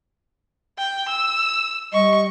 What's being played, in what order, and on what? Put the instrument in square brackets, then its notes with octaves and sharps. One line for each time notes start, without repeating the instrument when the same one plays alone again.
[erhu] G5
E6
[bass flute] G3 [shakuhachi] D#5 [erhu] C#6